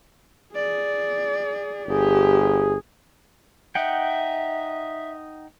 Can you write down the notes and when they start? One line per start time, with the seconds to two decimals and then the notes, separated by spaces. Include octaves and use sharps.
0.55 G#4 D5
1.88 G1 G4 G#4
3.75 D#4 E5 F#5 G5